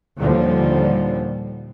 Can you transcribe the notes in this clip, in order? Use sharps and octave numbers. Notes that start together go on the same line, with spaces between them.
D#2 A#2 D3 F3 G3